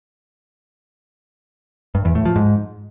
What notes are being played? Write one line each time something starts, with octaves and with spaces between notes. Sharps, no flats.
G2
E2
A2
F3
G#2